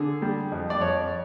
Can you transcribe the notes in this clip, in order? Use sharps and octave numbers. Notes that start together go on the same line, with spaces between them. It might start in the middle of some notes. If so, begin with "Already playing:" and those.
Already playing: D3 G#4
G3
F2
D5
F2 C#5